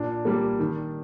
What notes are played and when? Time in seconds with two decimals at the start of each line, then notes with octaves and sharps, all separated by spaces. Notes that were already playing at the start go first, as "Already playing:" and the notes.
Already playing: A#2 D4
0.25 G3 A#3
0.60 D#3